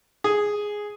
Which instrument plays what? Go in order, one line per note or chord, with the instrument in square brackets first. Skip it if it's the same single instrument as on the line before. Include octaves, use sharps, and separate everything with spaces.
[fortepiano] G#4